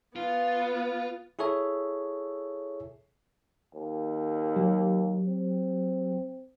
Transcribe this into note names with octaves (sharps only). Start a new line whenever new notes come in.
B3 F4
E4 G#4 A4 C#5 E5
D#2
F#3 G4
C4